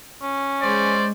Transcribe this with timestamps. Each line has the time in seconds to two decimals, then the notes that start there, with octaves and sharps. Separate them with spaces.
0.22 C#4
0.62 G#3 C5 D5